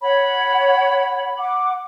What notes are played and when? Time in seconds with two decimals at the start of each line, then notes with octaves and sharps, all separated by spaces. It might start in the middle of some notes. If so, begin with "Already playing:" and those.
0.02 C#5 F#5 B5
1.38 F#5 D6